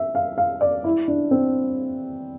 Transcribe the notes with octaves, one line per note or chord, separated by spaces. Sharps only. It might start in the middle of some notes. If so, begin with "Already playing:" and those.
Already playing: E5
F5
F5
D5
E4
D4
C4